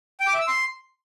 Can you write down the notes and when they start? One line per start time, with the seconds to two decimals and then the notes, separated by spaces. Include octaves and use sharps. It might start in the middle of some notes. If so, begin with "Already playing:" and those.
0.20 G5
0.27 D6
0.34 E5
0.41 E6
0.48 C6